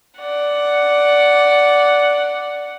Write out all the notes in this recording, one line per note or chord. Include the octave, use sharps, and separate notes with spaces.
D5 F#5